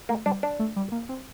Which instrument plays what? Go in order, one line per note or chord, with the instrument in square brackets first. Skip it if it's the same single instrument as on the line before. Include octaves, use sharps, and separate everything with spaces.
[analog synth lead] A3 [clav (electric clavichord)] A#3
[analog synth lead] G3 [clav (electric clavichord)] D4
[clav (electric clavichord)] D4
[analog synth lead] A3
G3
A#3
C4